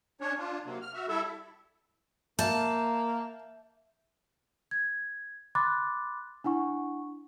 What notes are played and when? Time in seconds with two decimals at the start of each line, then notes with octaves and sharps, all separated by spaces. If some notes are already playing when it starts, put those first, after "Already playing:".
0.21 C#4 D4 C#5
0.38 D4 F4
0.66 C3 F#3 A#3
0.82 F6
0.94 F#4 E5
1.08 G3 E4 A4 E5
2.39 A#3 E5 A5 G6
4.71 G#6
5.55 B5 C6 D6 F#6 A6
6.44 D4 E4 F#5 C#6